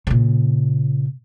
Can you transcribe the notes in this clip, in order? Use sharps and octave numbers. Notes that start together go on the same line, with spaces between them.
A#2 C#3